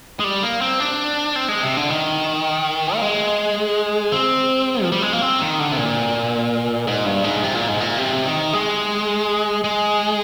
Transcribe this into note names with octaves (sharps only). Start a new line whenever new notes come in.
G#3
G3
A#3
C4
D4
C4
G#3
C3
D3
D#3
A#3
G#3
C4
F3
G3
G#3
A#3
C4
D#3
D3
C3
A#2
G#2
G2
G#2
C3
A#2
G#2
A#2
C3
D#3
G#3
G#3